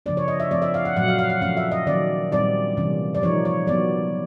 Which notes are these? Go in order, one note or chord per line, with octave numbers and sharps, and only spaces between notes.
C#3 F3 A#3 D4 D5
C#5
D#5
E5
F3 A3 C4 D5
E5
F5
F#5
A#2 F#3 A3 F#5
F5
F5
F#5
F3 A3 C#4 F5
E5
D#5
D#3 F#3 A#3 C#4 D5
A#2 G3 C4 D#4 D5
C3 E3 G3 A#3 C#4
D5
F3 A#3 D#4 C#5
C#5
F#3 B3 D#4 D5